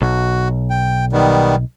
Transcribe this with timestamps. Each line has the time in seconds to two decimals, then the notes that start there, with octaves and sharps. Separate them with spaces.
0.02 B1 F#4
0.70 G5
1.13 D#3 G3 B3